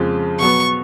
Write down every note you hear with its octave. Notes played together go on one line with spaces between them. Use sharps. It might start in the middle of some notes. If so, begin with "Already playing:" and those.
Already playing: F2 C#3 F3 G#3
B2 F#3 B3 C#6